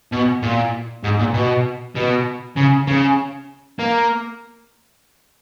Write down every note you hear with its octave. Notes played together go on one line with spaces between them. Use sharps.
B2
A#2
G#2
A#2
B2
B2
C#3
C#3
A#3